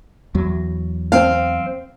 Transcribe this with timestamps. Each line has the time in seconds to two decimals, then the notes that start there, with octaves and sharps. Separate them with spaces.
0.35 E2 F#3
1.12 C4 F5